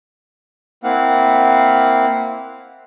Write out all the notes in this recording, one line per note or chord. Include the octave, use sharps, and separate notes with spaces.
A#3 C4 E4 F5 F#5